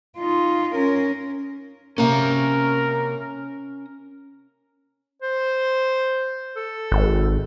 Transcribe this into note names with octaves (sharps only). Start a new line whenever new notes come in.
D#4 F4
C#4 A#4
C3 A#3 C#4 A#4 A#5
C5
A4
G#1